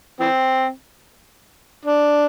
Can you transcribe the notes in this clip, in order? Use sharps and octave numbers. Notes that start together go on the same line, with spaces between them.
E3 C4
D4